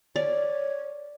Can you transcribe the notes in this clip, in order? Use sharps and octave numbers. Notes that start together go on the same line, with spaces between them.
C#5 D5